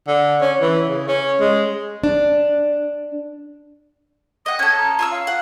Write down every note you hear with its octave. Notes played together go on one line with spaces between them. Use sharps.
D3
C#4
E3
C#3
C#4
G#3
D4
D#5 F#5 D#6
C#4 A4 G#6
A#5
F4 C#5 E6
F5
F#5